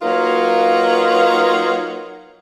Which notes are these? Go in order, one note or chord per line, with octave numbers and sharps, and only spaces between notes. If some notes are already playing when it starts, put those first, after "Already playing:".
F#3 A#3 D#4 F4 A#4 B4